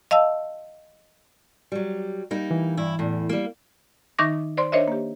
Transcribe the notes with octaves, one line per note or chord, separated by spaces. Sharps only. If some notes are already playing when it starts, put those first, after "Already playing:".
D#5 F5 A5 E6
F#3 G3
G3 A#3 D#4
E3
G2 E4
E2 A2
G3 A#3
D#3 D#4 E5 C#6 D6 A#6
C5 D5 C6
D4 A#4 C5 C#5 D#5 E5
A#3 G4